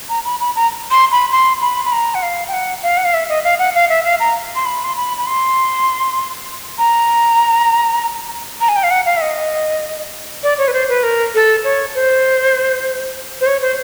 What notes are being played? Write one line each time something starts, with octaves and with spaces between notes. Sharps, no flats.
A#5
B5
B5
A#5
C6
B5
C6
B5
B5
A#5
F#5
F5
G5
F#5
F5
F#5
F5
E5
D#5
F5
F#5
F5
E5
F5
A#5
C6
B5
C6
B5
B5
C6
A#5
A#5
G#5
G5
F5
F#5
F5
E5
D#5
D5
C#5
B4
C5
B4
A#4
A4
C#5
C5
C5
C#5
C5